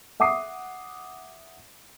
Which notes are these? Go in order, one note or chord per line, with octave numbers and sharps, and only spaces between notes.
E5 F#5 D6 D#6 C7